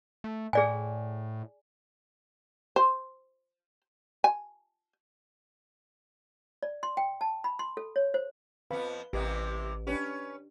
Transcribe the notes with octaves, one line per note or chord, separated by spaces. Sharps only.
A3
A2 G#4 D5 G#5
C5
G#5
D5
C6
G5
A5
B5
C6
A4
C#5
C5
F2 F3 B3 B4 F5 B5
A1 C3 E3 A#3 G4 B4 D#5
C#4 D4 G4 B4